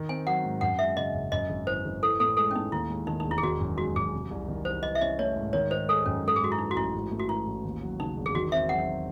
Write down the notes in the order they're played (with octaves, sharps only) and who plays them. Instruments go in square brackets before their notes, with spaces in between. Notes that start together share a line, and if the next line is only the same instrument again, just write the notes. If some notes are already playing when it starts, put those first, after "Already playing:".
Already playing: [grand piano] D#3
[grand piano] C4 [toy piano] G#5
[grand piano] F#3 [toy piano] F#5
[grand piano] G#2
[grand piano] F#2 [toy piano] F#5
[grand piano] G#3 [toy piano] E5
[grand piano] C#3 [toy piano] D#5
[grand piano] F#1
[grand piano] F#2 [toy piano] D#5
[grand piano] G#1
[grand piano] E3 [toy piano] C5
[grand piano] G#1
[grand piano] E3 [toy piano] A4
[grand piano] A2 [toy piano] A4
[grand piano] G#3 [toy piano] A4
[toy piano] C#4
[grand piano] A2 [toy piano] D#4
[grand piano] D#2 [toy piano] E4
[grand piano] G#3
[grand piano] D#3 [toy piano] D#4
[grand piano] E1 [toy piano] D#4
[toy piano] E4
G#4
[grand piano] D#3 [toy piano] F#4
[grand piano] F#2
[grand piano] G#3 [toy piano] F#4
[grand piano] F#2 [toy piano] G#4
[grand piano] C3
C2
D#3
[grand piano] C2 [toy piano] C5
[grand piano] E3 [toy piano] D#5
[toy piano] E5
[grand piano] C#4 [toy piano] D#5
[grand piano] A3 [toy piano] C#5
[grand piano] G#2
[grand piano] D#3 [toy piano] C#5
[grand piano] D#4 [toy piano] C5
[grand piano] G#3 [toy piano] A4
[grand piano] F#2 [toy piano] C#4
[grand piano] G#2 [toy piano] A4
[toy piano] G#4
[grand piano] G#3 [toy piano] F#4
[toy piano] E4
[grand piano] E3 [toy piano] D#4
[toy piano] F#4
[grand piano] A1 [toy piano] E4
[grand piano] G#2
A3
[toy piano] F#4
[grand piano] E3 [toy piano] E4
[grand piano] A1
D#2
F#3
[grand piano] C#3 [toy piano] D#4
[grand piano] E1
[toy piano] G#4
[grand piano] D#3 [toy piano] F#4
[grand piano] C4 [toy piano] E5
[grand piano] F#3 [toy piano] F#5